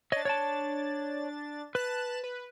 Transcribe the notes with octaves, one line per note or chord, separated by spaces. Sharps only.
D4 C#5 D#5 A6
C#5 D5 A5
B4 A5 F#6 E7
B4